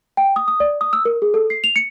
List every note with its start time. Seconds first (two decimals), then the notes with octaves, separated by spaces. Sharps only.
0.17 G5
0.36 D#6
0.48 D#6
0.60 D5
0.81 D#6
0.93 E6
1.05 A#4
1.22 G#4
1.34 A4
1.50 C7
1.64 F7
1.76 C#7